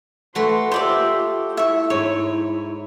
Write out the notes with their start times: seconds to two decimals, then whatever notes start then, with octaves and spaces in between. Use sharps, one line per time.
0.35 A3 F#4 B4 C6
0.72 F4 G4 C5 D5 E5
1.57 E4 E5 C#6
1.90 G#2 C#5